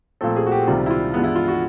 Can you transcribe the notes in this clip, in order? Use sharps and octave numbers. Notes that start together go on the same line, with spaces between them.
A#2 F3 A3 C4 A4
G#4
F#4
G4
C#2 C3 D#3 G3 C4 F4
E4
F4
G2 E3 G#3 B3
E4
F4
F#4